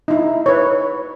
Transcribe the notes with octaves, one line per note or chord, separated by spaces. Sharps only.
D#4 E4
B4 C#5